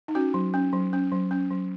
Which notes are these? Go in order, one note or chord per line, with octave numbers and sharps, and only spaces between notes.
D#4
C#4 F#4
F#3
C#4
F#3
C#4
F#3
C#4
F#3